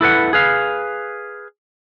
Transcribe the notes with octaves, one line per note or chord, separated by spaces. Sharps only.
E4 A4 B4 F#5
G#4 B4 F5